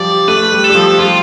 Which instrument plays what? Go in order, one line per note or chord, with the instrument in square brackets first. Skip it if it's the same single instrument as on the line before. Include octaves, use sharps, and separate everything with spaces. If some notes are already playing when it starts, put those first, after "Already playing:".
Already playing: [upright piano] F3 G3 [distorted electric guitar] D5
[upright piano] A3 [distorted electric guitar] B4
[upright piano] G3
[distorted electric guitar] A4
[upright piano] G3
F3
[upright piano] G3 [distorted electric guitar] F4